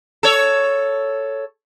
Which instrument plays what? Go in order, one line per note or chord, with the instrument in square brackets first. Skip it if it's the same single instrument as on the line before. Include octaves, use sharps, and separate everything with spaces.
[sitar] A4 C#5